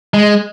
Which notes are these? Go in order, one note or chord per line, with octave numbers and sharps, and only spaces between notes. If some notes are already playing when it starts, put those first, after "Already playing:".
G#3